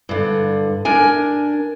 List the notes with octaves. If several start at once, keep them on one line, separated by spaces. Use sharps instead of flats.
G2 D3
D4 A#4 G#5